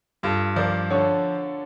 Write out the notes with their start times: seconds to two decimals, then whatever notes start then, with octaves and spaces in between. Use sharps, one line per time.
0.23 G2 F4 A4
0.56 F3 A#4 D5
0.90 D3 A4 C#5